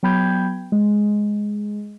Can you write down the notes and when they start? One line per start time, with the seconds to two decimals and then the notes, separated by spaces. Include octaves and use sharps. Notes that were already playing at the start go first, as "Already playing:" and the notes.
0.03 F#3 B3 G5 B5 G6 G#6
0.72 G#3